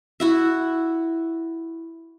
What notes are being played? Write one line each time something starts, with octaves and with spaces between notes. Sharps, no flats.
E4 F#4 E5